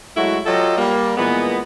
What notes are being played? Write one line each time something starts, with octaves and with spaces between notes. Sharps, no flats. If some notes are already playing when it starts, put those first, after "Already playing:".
F#3 G#3 A3 E4 F#4
F#3 F4 G4 A4 D#5
G3 A#3
A#2 E3 G#3 B3